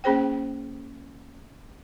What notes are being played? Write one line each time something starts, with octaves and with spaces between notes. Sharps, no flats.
A#3 C#4 G#4 C5 G5